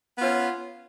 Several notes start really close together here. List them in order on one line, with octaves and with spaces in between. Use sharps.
B3 F4 C#4